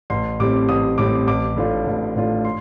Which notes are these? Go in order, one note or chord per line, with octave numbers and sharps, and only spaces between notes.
A1 C6
A2 G3 C4 D6
A1 D#6
A2 G3 C4 D6
A1 D6
A2 A3 D4 F4
A1
A2 A3 D4 F4
C6